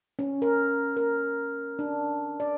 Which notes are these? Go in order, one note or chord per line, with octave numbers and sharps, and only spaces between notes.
C#4
A#4
A#4
D4
D5